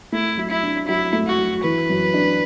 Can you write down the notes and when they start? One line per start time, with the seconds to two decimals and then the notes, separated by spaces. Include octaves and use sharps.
0.12 A3 E4
0.37 F#3
0.51 E4
0.63 D4
0.87 F#3 E4
1.13 A3
1.27 F#4
1.38 F#3
1.63 E3 B4
1.90 F#2
2.14 D4